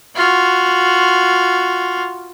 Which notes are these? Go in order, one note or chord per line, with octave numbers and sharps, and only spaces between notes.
F4 F#4